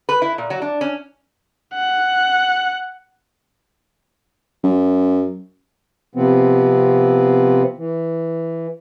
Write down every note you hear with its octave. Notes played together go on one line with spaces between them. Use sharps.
B4
E4
A#2
F#3
D4
C#4
F#5
F#2
C3 F3 B3 C4
E3